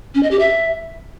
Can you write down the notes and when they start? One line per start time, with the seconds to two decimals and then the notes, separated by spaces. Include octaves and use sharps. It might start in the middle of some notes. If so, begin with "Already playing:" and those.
0.15 C#4
0.23 D#5
0.31 G4
0.39 E5